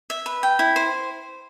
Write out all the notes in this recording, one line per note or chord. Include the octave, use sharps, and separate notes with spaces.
E5
B4
G5
E4
C5